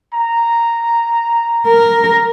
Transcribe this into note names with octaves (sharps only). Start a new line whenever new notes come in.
A#5
A#4